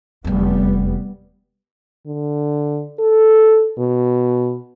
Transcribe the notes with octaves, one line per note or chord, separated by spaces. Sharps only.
F1 E2 G3 B3
D3
A4
B2